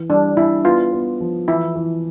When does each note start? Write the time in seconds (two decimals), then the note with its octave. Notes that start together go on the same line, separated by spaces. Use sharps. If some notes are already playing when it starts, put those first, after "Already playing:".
Already playing: E3
0.10 G3 D4
0.37 D4 E4
0.65 B3 F4
0.92 B3
1.21 F3
1.48 E3 E4
1.75 E3